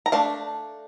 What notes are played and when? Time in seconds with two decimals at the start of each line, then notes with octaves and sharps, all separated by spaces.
0.06 A#5
0.12 A3 D4 F5 A5